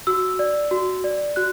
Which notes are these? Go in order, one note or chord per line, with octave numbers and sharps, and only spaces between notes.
F#4 E6
D5
F#4
D5
F#4 F#6